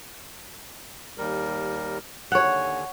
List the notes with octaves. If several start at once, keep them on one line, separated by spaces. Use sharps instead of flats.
D#2 G3 A#4
D#2 D3 C#5 F#5 G#5